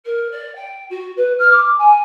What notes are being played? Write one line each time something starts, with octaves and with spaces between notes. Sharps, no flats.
A#4
D5
G5
F#4
B4
F6
D6
G#5